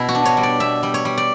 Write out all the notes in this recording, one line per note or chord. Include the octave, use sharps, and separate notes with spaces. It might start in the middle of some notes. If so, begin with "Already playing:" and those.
Already playing: B2 E4
F#4
D4
C#5
G3
D5
B2 E5
G3
C#5
G3
D5